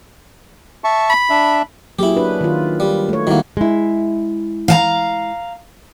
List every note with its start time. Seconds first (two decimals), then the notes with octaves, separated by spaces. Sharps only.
0.84 E5 A5 C#6
1.10 B5
1.30 D4 E5
1.99 F#3 A#3 E4 G4 G#4
2.16 D4 B4
2.41 D#3 F4
2.80 G3
3.09 A3 C#5
3.27 D#3 G3 A#3 E4 F#4
3.57 G#3 E4
4.68 F5 A5 A#5